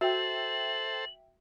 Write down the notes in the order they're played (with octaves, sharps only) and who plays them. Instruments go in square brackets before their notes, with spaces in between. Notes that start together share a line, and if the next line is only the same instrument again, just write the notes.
[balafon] F#4 [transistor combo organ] A4 C5 [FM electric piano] E5 G5 [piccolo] F#7